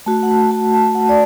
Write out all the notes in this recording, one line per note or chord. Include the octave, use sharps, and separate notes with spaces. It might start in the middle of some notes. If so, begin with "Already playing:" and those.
A3 F#4 A5
F#5
A5
A5
A5
F#5
D5